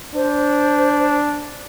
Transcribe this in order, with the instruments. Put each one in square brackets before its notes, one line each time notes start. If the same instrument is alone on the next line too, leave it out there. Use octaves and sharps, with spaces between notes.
[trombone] D4 [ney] C5